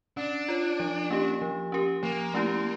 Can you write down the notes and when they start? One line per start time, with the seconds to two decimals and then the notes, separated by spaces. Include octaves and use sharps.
0.17 C#4 D4
0.48 F4 C#5
0.80 F3
1.11 A#3 C#4 G4
1.42 F3
1.72 C#4 G4 A#4
2.03 F3 A#3
2.34 A3 C#4 E4 G4